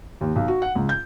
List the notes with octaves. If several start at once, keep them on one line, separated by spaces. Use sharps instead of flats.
D#2
B1
F#4
F#5
C#2
G6